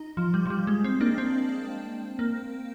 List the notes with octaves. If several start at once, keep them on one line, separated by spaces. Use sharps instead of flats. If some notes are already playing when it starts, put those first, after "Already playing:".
Already playing: D#4
F3
G3
F3
G3
G#3
C4
A#3 D4
C4
A#3